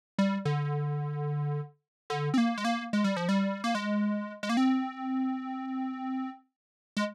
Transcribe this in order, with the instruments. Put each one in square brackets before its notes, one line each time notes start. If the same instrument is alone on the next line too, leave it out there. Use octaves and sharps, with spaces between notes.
[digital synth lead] G3
D3
D3
C4
A#3
G#3
A#3
G#3
G3
F3
G3
A#3
G#3
G#3
A#3
C4
G#3